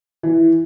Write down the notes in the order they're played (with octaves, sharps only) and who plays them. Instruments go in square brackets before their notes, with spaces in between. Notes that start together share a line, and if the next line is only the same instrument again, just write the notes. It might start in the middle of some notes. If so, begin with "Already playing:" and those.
[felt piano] E3